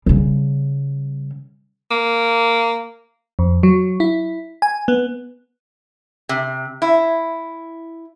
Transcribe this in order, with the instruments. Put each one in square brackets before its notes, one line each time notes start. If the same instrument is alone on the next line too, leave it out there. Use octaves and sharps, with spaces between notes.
[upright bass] C#3 G3
[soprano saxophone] A#3
[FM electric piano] F2
F#3
E4
G#5
B3
[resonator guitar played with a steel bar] C3
E4